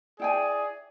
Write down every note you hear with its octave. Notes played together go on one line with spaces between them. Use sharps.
E4 G#4 D5 G5 G#5